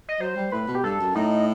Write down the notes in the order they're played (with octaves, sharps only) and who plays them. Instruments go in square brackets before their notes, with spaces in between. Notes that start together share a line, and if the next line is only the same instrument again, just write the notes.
[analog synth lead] D#5
[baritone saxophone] F#3 [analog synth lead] C5
[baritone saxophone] G3
[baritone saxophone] A2 [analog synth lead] B4
[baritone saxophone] B2
[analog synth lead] G4
[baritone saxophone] G2 [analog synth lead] A4
[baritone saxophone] F#2
[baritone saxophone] A2 [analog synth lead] D#4